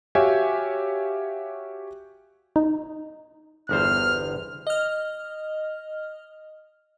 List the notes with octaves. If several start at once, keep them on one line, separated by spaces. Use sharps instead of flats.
F#4 G4 C#5 E5 F5 G#5
D#4
G1 E2 C5 F6
D#5 F6